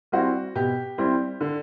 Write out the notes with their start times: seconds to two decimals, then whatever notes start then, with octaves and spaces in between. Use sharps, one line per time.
0.12 G3 C4 E4 F#4
0.55 B2 G4
0.98 G3 C4 E4
1.41 D3